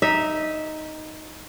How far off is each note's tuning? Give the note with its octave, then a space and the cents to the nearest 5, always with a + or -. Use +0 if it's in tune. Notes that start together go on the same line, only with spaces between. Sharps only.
D#4 +0 E5 -15